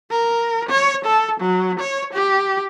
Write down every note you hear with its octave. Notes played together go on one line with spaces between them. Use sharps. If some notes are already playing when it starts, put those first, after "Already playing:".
A#4
C#5
A4
F#3
C#5
G4